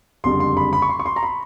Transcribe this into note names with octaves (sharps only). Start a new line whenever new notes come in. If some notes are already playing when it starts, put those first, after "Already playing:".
F#1 F2 D3 G3 C6
C6
B5
B5
C#6
C6
C#6
C6
A#5
B5